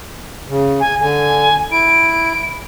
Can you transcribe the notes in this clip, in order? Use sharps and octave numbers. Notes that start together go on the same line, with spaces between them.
C#3
G#5
D3 G#5
E4 D7